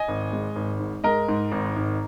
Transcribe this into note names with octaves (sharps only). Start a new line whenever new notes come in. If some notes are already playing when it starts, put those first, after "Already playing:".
Already playing: D#5 G#5
G#1
G#3
G#1
G#2
G#3 A#4 D#5
G#2
G#1
G#1